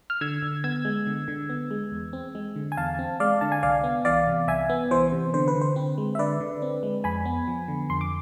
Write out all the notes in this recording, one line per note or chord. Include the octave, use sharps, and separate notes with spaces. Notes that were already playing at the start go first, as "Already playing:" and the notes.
F6
D3 E6 G#6
D3
B3 E6 G#6
G#3
D3
D3
B3
G#3
E2
C4
G#3
D3
G#5
E2 F5 A5
C4
G#3 D5 F5
D3 A5
G#5
C2 D5 F5
B3
E3 D5 F5
C3
C2 E5 G#5
B3
E3 C5
C3
D3 C5
B4
D3
C5
C4
G#3
E5
D3 B4 D5
D3
C4
G#3
F2 G#5 B5
B3
F3
D3
F2 C6
D6